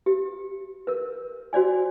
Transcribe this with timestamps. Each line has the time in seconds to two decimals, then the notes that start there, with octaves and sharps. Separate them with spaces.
0.06 G4
0.87 A#4 B4
1.53 F#4 C5 D5 G#5